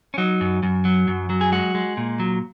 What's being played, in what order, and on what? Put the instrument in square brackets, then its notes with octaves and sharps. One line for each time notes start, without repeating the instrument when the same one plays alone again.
[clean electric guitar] C#4
F#3 D#4
F#2
F#2
F#3
F#2
F#3
G#4
G#3 F#4
G#3
A#2
F#3